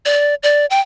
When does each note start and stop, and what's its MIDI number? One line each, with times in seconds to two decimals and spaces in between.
0.05 0.35 74
0.43 0.66 74
0.70 0.80 79